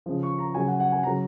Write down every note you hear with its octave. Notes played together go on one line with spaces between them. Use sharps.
C#3 F3
C#6
A#5
C#3 F#3 G#5
F#5
F#5
G#5
C#3 F#3 A#5